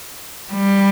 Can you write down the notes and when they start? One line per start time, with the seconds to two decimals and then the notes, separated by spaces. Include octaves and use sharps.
0.53 G3